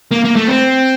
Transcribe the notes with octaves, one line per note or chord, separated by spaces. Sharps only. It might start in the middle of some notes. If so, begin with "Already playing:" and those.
A#3
A#3
A3
C4